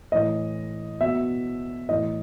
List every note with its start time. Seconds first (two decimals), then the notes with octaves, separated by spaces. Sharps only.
0.12 A2 E3 D#5
1.00 B2 E5
1.89 A2 E3 D#5